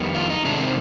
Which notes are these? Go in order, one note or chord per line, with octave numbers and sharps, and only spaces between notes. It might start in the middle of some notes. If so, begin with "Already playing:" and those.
Already playing: F2 D#3 G3 B3
F4
D#4
C3 D#3 G#3 D4
C4